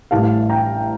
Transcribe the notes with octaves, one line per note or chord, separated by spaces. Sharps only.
A1 A2 G3 F5 A5
G5 A#5